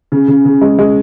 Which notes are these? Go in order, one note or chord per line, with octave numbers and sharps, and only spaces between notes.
C#3
C#3
C#3
G#3
G#3